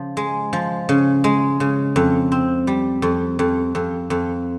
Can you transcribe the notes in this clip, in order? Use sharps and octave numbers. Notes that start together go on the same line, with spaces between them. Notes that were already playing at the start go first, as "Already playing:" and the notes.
Already playing: C#3 F3
G#3
F3
C#3
G#3
C#3
F2
C4
G3
F2
F2
F2
F2